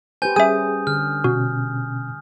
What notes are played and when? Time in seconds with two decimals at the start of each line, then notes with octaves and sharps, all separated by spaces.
0.22 G4 B4 C5 G#5 G6
0.36 G3 C#4 G#4 E5 G#5 D#6
0.87 D3 F6
1.24 B2 C#4 F#4